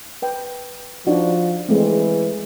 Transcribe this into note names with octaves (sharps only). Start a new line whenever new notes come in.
B4 G5
F3 D4 D#4 F#4
E3 G#3 A3 C4